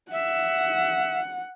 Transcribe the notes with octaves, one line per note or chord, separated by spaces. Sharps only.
E5 F#5